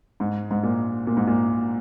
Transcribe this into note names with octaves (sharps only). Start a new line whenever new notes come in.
G#2
G#2
A#2
A#2
G#2
A#2